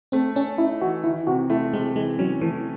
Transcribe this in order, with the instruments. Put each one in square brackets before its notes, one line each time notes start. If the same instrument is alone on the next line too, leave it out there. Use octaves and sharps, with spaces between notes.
[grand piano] A3 [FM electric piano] C4
[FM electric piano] C#4 [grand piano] A4
[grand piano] D#4 [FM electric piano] E4
[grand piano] E3 [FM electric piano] F#4
[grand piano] D#3 [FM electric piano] E4
[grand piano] C3 [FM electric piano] F#4
[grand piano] A3 [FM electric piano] E4
[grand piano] C3 [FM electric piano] G#3
[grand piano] E3 [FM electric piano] G#3
[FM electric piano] F#3 [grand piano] C#4
[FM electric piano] E3 [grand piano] A3